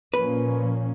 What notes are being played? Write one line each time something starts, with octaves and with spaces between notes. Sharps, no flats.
A#2 F3 A#3 C#4 B4